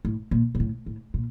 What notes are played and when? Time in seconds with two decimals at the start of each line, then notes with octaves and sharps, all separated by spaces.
0.05 A2
0.31 A#2
0.55 A#2
0.60 A2
0.86 A2
1.14 A#2